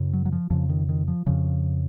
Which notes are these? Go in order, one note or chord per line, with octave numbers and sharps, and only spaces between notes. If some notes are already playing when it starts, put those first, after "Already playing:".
Already playing: F#2 C#3
F#3
F#3
F3
F2 C#3 F3
D#3
D#3
F3
F2 C#3 F3